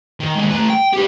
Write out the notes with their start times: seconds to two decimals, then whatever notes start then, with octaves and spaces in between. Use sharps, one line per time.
0.20 D#3
0.35 D#2 G#3
0.51 A3 B4
0.70 G5
0.93 G4 B4